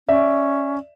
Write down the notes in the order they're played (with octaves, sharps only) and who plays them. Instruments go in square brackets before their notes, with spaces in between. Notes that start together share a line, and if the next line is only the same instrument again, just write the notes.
[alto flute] C#4 [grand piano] D5 E5